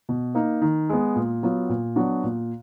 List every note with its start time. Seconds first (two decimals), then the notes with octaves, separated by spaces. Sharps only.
0.09 B2
0.35 A#3 D#4
0.62 D#3
0.90 G#3 B3
1.16 A#2
1.43 F#3 B3 F4
1.69 A#2
1.96 F#3 B3 D4 F#4
2.23 A#2